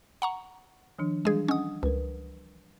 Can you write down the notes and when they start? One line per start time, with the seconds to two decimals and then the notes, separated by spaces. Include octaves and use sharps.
0.22 F#5 A#5 C#6
0.99 D#3 F3 D4
1.25 E3 G3 G#3 D4 G#4
1.48 C#4 D4 D#5 F#5 D#6
1.83 C#2 A#4 B4